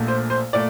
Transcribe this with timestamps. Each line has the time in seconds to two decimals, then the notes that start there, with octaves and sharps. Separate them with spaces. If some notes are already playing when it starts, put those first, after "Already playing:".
Already playing: A#1 A#2 A3
0.08 C5
0.30 C5
0.53 A#2 A3 D5